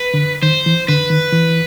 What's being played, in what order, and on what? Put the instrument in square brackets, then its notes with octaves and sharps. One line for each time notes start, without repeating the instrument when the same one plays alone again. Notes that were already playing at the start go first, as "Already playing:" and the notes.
Already playing: [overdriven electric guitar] B4
[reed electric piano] D3
[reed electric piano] D#3 [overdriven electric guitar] C5
[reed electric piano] E3
[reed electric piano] D3 [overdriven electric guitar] B4
[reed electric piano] D#3
E3